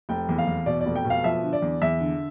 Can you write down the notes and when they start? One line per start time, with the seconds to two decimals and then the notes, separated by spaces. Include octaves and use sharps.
0.09 F1 G5
0.29 E2
0.38 F5
0.47 E2
0.66 B2 D5
0.81 D5
0.86 F1
0.96 G5
1.05 B2
1.10 F5
1.24 F3 E5
1.43 D3
1.53 D5
1.62 E2
1.82 E2 E5
2.01 D3